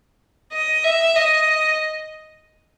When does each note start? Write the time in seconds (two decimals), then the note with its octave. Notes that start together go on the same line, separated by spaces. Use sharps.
0.53 D#5
0.84 E5
1.15 D#5